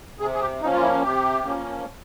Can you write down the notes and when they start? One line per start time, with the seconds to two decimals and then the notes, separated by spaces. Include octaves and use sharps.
0.20 C3 G#4
0.34 G#4
0.41 G4
0.61 F3 A#3 C#4 D#4
0.73 F4
0.82 E4
1.02 C3 G4
1.44 F3 A#3 C#4